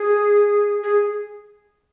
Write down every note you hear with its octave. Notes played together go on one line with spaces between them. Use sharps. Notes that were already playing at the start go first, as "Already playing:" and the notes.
Already playing: G#4
G#4